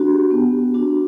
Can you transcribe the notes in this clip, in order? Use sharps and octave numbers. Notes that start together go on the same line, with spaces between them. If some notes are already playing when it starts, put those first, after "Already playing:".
Already playing: D4 F#4
G4
B3
D4 F#4